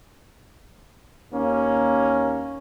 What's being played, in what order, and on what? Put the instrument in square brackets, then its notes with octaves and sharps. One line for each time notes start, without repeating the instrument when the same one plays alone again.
[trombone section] D#2 A#3 C#4